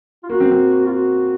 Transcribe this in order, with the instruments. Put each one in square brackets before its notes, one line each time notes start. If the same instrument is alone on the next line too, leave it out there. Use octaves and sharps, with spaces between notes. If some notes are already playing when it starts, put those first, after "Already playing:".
[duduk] F4
[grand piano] A#3 [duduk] F#4
[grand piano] C4
C4
[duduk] F4
F#4